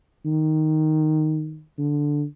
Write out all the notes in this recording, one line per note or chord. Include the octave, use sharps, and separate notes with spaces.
D#3
D3